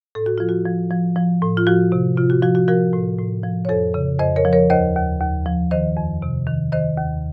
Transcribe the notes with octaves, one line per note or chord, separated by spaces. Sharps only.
A2 A4
F#4
F3 F4
F#4
F3
F3
F3
A2
F4
F3 F#4
C3
C3 F4
F#4
F3 F#4
F#4
F3 F#4 A#4
A2
A2
F3
C#5
F2 A4 C5
C#3
F2 C5 D#5
A#4 C#5
F3
A#4 C#5
D#2 C5 D#5
D#2
D#2
F3
D#3 C5 D#5
F2
C3
D#3
D#3 C5 D#5
D#2